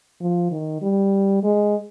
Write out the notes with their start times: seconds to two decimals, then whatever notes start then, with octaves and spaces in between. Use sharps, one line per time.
0.21 F3
0.51 D#3
0.82 G3
1.43 G#3